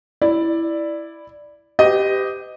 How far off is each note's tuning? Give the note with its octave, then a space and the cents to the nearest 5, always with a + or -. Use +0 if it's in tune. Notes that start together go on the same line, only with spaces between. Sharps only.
E4 +0 D5 +5
G4 +0 B4 +45 D#5 +0